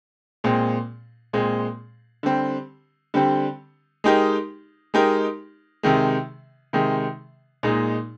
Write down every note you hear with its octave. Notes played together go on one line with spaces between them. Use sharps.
A#2 G#3 C4
A#2 G#3 C4
D3 G3 C4 G4
D3 G3 C4 G4
G#3 D#4 G4 A#4
G#3 D#4 G4 A#4
C3 D#3 G#3
C3 D#3 G#3
A#2 G#3 D#4